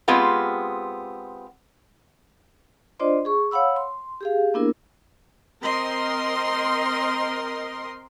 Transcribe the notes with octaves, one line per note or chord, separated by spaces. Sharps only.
G#3 B3 C4 F4 G4
D4 F4 C5 D5 D#5 C6
G#4 C#6
C#5 F5 F#5 B5 E6
C6
G4 G#4 F5
A#3 B3 D4 E4 A#4
C4 A#4 D#5 C6